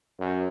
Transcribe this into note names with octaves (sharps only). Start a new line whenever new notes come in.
F#2